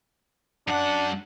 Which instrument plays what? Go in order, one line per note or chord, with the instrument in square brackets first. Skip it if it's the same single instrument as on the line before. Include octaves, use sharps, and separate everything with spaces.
[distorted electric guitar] F#2 F#5 [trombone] D4